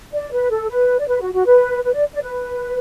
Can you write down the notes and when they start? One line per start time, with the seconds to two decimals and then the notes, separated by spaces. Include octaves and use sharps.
0.13 D5
0.32 B4
0.50 A4
0.69 B4
0.99 D5
1.08 B4
1.21 F#4
1.34 F#4
1.46 B4
1.83 B4
1.94 D5
2.13 D5
2.22 B4